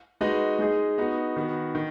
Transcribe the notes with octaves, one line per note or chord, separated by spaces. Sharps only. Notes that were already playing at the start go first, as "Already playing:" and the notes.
G#3 D#4 F#4 B4 D#5
G#3 D#4 G#4 D#5
B3 D#4 F#4
D#3 B3 F#4
D#3